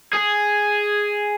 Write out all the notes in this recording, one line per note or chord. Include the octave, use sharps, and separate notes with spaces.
G#4